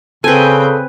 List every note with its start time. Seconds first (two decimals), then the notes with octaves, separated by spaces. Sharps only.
0.24 C#3 C4 A4 B4 G5 G#5